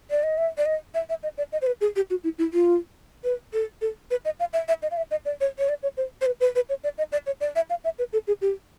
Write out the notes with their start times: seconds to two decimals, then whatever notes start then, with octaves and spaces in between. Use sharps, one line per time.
0.11 D5
0.23 D#5
0.38 E5
0.58 D5
0.66 D#5
0.94 E5
1.09 E5
1.23 D#5
1.38 D5
1.52 D#5
1.62 C5
1.67 B4
1.81 G#4
1.96 G4
2.10 F#4
2.24 E4
2.38 E4
2.53 F4
3.24 B4
3.53 A4
3.81 A4
4.11 B4
4.25 D#5
4.40 F5
4.53 E5
4.68 E5
4.82 D#5
4.91 F5
4.97 E5
5.11 D#5
5.25 D5
5.41 C#5
5.59 C#5
5.69 D5
5.83 C#5
5.97 C5
6.21 C5
6.26 B4
6.40 B4
6.55 B4
6.69 C#5
6.84 D5
6.98 D#5
7.12 D5
7.26 C#5
7.41 D5
7.56 E5
7.70 F5
7.84 E5
7.99 B4
8.13 A4
8.27 G#4
8.42 G4